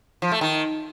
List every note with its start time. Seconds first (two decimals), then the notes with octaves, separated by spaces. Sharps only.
0.22 F3
0.32 A3
0.41 D#3